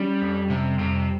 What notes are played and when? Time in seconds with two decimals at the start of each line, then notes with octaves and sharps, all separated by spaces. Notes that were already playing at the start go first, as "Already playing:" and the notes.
Already playing: G3 C#4
0.22 F2
0.50 C3 G3
0.79 F2 C3